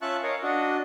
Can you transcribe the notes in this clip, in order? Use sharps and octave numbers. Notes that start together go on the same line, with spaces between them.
C#4 F4 E5 A5 C#6 F#6
A#4 C#5 D#5 F5
D4 F#4 D#5